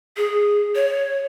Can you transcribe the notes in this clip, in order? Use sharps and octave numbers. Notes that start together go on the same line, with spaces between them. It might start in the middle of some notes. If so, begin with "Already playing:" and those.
G#4
C#5